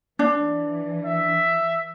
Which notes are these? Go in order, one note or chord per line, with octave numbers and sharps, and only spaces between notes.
E3 D4
E5